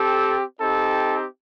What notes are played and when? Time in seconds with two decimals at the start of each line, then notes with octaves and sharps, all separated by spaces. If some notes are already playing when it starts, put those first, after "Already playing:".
Already playing: C4 G4 A4
0.61 C4 D#4 G4 A4